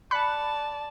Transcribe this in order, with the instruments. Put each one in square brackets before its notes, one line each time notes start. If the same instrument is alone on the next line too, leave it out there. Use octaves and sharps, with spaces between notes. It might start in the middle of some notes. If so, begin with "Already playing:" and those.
[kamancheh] D5 A5 [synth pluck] B5 F#6 C#7